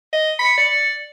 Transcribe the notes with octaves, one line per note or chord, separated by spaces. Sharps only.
D#5
B5 C#7
D5